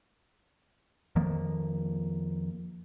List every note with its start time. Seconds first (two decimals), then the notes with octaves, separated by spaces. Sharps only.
1.16 F2 D#3 F3 A#3